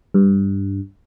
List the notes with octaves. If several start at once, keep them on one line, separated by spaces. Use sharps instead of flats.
G2